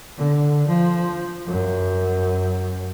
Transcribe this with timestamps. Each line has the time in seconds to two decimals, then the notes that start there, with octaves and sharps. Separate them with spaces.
0.17 D3
0.67 F3
1.47 F#2